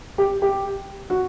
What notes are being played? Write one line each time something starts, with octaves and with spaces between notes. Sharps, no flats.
G4
G4
F#4